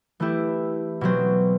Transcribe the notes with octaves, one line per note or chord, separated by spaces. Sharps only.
E3 A3 E4 G4
B2 F#3 C4